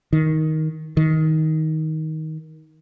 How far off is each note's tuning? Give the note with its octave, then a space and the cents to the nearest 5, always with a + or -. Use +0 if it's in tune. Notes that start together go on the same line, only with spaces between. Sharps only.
D#3 +10
D#3 +15